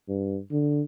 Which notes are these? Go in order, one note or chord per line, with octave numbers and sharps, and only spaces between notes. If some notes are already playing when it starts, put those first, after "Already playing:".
G2
D3